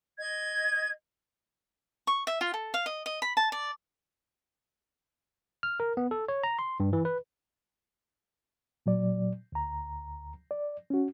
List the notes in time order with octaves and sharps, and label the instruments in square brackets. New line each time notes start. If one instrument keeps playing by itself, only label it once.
[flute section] D#5 G#6
[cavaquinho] C#6
E5
F4
A4
F5
D#5
D#5
B5
A5
D5
[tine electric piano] F6
A#4
B3
A4
C#5
A#5
C6
G2
E3
B4
[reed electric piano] A#2 F#3 D5
D2 A#5
D5
C#4 F#4